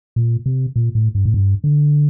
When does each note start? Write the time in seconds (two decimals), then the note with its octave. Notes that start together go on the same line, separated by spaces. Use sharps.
0.16 A#2
0.46 C3
0.76 A#2
0.95 A2
1.15 G2
1.25 A2
1.34 G2
1.64 D3